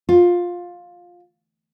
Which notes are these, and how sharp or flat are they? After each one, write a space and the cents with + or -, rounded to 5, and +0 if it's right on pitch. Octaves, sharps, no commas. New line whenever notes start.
F4 +15